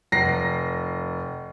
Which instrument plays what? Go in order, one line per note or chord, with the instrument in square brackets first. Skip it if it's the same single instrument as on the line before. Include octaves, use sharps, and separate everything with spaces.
[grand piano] F1 A#6 C7